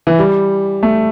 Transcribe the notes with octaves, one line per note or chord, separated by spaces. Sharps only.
E3
G3
A3